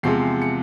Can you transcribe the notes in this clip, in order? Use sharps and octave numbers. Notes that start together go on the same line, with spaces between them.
E2 C3 F3 G#3 C7
C#7